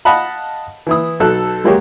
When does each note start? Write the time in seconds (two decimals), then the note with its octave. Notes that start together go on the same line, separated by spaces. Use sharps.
0.05 D#5 F5 F#5 A5 B5
0.87 E3 E4 D#6
1.20 B1 B2 A4 F#6
1.64 F#3 G#3 A#3 F#4 G4 C#5